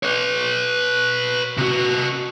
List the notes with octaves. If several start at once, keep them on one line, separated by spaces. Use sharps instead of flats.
B4 C#5
C3 F#4